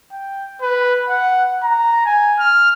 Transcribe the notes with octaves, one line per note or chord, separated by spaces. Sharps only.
G5
B4
F#5
A#5
G#5
F6